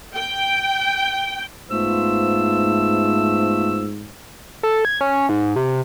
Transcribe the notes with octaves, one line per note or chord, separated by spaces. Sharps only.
G5
G#2 A3 B3 F4 C5 E6
A4
G#6
C#4
G#2
C3